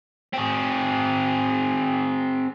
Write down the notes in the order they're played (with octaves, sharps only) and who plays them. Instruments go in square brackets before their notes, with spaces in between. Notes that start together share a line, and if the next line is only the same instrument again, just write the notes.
[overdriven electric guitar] C4 G#4